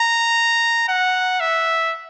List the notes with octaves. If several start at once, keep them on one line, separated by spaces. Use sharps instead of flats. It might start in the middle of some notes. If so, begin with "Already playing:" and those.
Already playing: A#5
F#5
E5